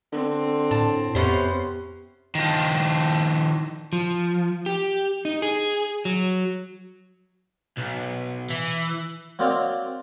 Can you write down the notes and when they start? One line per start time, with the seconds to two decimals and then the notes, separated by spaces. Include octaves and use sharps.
0.12 D3 C4
0.71 A2 A5
1.15 F2 C3 B3 C#4 C5
2.35 D#3 F3
3.93 F3
4.66 G4
5.25 D#4
5.42 G#4
6.05 F#3
7.77 B1
8.50 E3
9.39 F#3 A#3 C4 D5 D#5 F5